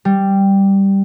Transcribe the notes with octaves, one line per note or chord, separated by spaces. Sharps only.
G3